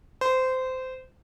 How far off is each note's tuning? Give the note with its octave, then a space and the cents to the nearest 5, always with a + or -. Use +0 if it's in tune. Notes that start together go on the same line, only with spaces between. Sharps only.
C5 -20